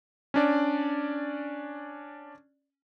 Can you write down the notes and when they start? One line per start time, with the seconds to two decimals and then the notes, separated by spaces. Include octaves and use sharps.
0.34 C#4 D4 D5